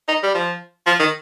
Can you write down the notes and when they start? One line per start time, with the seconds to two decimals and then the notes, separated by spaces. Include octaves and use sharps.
0.08 D#4
0.23 G3
0.35 F3
0.87 F3
1.00 D#3